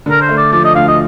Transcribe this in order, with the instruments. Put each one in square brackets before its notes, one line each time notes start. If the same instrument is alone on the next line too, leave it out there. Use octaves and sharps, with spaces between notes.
[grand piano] D3 [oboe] A#4
[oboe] C5
[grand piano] A3
[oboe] D5
[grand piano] F3 [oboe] D5
[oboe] D#5
[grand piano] D2 [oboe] F5
[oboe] D#5